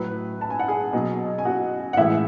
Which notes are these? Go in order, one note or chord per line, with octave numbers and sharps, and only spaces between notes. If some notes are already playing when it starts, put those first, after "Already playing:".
Already playing: A2 F#3 B4 B5
A5
G#5
F#5
G#4 G#5
B2 F#3
G#5
F#4 F#5
F#5
A2 E3 G#3 E4 E5